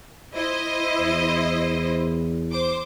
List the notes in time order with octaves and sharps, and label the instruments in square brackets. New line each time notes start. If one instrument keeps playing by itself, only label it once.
[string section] E4 C5 D#5
[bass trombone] E2
[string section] C5 D6